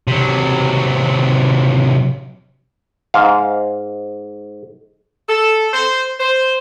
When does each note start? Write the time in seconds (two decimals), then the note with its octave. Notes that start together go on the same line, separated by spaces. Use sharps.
0.08 C3 F#3
3.14 G#2 F5
5.29 A4
5.73 C5
6.20 C5